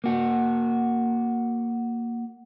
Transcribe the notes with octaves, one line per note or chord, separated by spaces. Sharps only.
A#3 F#4